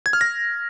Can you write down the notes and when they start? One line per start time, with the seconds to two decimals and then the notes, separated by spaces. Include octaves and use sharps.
0.06 G#6
0.13 F6
0.21 A#6